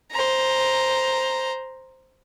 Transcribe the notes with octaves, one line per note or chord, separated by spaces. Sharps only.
C5 A#5